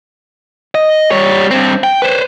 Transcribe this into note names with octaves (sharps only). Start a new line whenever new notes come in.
D#5
G3 C#5
G2 C4
G5
B4 C5